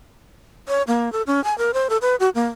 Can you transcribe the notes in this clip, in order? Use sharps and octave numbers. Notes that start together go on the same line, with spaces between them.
C#5
A#3
A4
C#4
G#5
A#4
C5
A4
B4
F#4
A#3